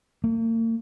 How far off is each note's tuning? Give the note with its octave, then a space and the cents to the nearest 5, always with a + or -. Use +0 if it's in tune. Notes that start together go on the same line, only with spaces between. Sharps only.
A#3 -45